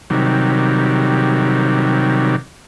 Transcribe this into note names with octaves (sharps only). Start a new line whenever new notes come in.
C3 D#3 F#3 G3